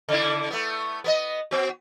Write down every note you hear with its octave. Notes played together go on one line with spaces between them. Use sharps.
C#3 D4 E4
A3 B3
B3 A#4 D#5
B3 F#4